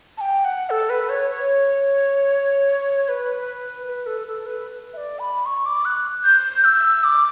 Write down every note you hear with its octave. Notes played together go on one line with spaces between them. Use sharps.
A5
G5
F#5
A4
B4
C#5
C#5
B4
B4
A4
A4
B4
E5
D5
B5
C#6
D6
F#6
G6
E6
D6